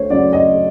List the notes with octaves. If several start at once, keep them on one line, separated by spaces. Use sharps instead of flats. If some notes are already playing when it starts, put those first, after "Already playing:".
Already playing: D2 C5 C#5
C#3 F#3 D5
D#5